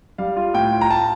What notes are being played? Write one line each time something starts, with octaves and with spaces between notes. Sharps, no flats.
G3 F5
F4
A2 G5
F4
A#5
F4 A5